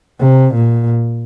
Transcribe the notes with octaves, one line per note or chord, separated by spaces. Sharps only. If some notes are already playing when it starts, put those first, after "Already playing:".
C3
A#2